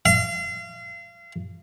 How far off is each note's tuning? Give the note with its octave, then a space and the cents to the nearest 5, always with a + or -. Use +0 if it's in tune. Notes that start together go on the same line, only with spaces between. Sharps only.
F5 -35